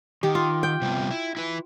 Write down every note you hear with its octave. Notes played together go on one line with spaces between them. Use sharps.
D#3 G4
F4
G5
C3 G3 B3
E4
E4 B4